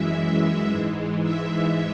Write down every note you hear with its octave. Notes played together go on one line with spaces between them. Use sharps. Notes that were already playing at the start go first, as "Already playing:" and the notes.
Already playing: F#2 E3 G#3 E5
G#2 E3 G#3
E5